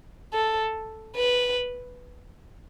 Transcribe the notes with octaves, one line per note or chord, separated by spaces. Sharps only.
A4
B4